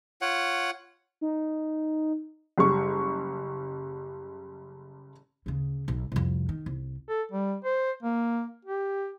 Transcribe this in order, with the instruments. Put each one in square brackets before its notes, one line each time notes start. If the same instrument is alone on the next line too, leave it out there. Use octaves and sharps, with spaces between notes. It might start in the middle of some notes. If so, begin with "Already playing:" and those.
[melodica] F4 C#5 F#5
[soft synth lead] D#4
[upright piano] F#1 G3 C#6
[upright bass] D2 C#3
B1
C2 F2
D#3
C2
[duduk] A4
G3
C5
A#3
G4